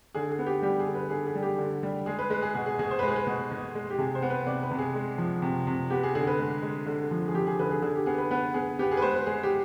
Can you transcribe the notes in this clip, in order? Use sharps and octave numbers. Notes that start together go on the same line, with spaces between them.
D3 G#4
G#4
B3
G4
G3 G4
G#4
D3
B4
D3 G#4
G#4
G3
G4
D3
G3
G#3 G#4
B4
G#3 B4
G#4
B2 G#4
G#4
B2 G#4
C5
B4
G#3
G#4
B4
B2
B2
G#3
G4
C3 G#4
C5
B3
B4
C3 D5
B4
C3
G#4
G#3
F3
C3
C3
B3 G4
G#4
D3 G#4
B4
G#3
G#3
D3
F3
G#4
F3 G4
G#4
D3 B4
G#4
D3 G#4
G4
B3 G#4
B4
B3 B4
B3 G#4
B3 G4
G#4
B4
G#3 C5
B4
G#3 G#4
G4